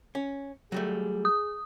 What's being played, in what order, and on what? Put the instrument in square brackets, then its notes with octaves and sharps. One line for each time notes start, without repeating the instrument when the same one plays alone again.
[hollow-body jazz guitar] C#4
[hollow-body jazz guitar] F#3 G3 A3 [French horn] G#4
[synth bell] D#6